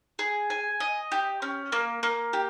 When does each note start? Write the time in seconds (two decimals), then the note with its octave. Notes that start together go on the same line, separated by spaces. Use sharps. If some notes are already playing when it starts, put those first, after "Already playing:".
0.19 G#4
0.50 G#5
0.80 D#5
1.12 G4
1.42 C#4
1.72 A#3
2.03 A#3
2.33 G4